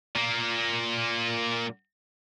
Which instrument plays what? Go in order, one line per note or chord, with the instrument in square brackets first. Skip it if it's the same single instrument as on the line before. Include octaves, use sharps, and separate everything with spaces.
[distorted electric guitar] A#2 A#3